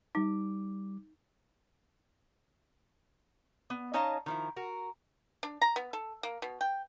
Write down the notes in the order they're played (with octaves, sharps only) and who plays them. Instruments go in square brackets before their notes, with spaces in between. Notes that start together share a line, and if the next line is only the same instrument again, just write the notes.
[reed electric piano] G3 D6 [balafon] D#4
[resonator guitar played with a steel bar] B3
C#4 D#4 C#5 D#5 F5 A5
D#3 F3 E4
F#4 A#4
[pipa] D4
A#5
B3
A4
A#3
B2
G5